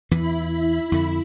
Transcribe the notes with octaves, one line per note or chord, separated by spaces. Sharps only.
E2 E3 E4 B5
F2 D3